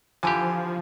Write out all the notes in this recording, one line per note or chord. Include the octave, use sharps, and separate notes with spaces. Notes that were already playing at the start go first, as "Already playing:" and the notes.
D3 E3 F3 G4 G#5